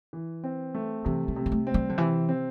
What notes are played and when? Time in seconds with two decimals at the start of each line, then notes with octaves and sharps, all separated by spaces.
0.13 E3
0.44 C4
0.74 A3
1.05 C3 E3
1.28 G3
1.36 C3
1.46 G3
1.52 A3
1.67 C4
1.74 G3
1.89 D3
1.98 C3 E3
2.29 C4